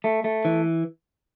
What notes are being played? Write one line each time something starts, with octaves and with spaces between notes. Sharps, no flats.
A3
A3
E3